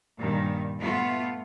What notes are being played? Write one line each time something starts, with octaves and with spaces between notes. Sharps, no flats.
G2 A#2 D#3
A3 B3 F4